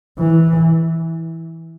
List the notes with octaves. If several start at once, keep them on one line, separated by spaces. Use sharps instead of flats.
E3